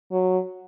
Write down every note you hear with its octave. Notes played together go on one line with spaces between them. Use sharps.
F#3